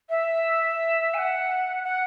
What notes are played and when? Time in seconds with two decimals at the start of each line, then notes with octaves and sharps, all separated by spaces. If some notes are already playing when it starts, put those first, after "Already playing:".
0.09 E5
1.14 G#5
1.17 F#5
1.84 F#5